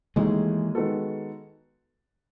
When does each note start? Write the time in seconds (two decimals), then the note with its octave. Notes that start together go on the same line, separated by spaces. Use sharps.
0.16 D#2 D#3 E3 G#3 A3 D#4 G#4
0.75 D#3 G#3 B3 F#4 A4